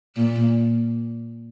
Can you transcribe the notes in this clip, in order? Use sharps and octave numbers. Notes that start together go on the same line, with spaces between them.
A#2